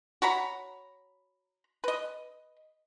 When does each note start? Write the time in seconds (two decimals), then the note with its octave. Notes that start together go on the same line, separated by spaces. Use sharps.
0.22 F#4 C#5 A#5 B5
1.84 B4 D#5